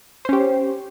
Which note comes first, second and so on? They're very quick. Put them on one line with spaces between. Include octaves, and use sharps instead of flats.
C5 C#4 G4